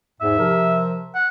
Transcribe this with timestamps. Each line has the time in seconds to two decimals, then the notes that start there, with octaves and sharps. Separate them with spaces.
0.21 E2 G#2 E5
0.38 C3 F3 A#4
1.15 F#5